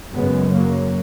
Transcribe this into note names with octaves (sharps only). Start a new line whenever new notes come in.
F#2 C#3 G#3 B3
F#3 A#3